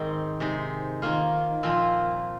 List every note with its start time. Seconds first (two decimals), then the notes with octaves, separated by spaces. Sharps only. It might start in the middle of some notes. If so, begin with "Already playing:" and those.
Already playing: G#2 D#3 G#3 C4 D#4
0.40 C3 G#3 D#4
1.02 D#3 A#3 F4
1.63 A#2 F3 C4 F4